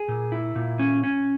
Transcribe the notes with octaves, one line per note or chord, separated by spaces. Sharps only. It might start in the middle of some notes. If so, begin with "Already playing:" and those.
Already playing: G#4
A#2
E4
A#2
C#4
C#4